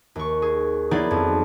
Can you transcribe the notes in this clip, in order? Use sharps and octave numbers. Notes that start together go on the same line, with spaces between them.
D#2 C#6
G#4
F#3 B3 D#4 E4 G#4 D5
F2